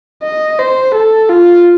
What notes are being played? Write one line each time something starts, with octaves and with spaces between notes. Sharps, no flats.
D#5
C5
A4
F4